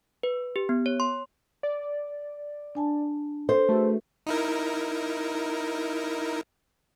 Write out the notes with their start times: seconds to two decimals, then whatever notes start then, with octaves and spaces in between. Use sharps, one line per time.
0.23 B4
0.56 G4
0.69 B3
0.86 C#5
1.00 C6
1.63 D5
2.75 D4 G#5 A5
3.49 A4 C5
3.69 A3 F#4 G#4 B4
4.26 D#4 E4 A#4